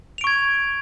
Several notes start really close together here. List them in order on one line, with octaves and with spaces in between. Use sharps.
F7 D7 C#6 G#6